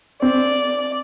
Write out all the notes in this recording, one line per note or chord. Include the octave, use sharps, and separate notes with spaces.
C4 D5